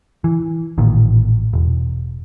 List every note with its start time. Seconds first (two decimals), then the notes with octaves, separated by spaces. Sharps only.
0.24 E3
0.78 A1 A#2 D#3
1.53 E1